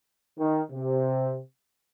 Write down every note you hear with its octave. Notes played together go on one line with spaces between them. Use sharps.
D#3
C3